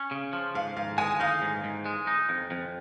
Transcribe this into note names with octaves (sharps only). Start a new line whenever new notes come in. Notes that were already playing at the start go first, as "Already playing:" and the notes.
Already playing: C#4
C#3
F3
G#2 F5
G#2 F5
G#3 G#5
D#4 F5
G#2
G#2
G#3
D#4
F2
F2